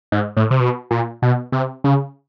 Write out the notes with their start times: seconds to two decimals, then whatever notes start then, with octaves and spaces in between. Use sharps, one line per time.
0.12 G#2
0.37 A2
0.51 C3
0.60 B2
0.91 A#2
1.22 B2
1.52 C3
1.84 C#3